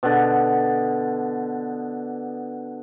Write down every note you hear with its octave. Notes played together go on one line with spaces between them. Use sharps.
B2 D3